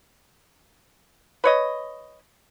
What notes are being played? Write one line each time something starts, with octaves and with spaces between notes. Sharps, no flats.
B4 C#5 D#5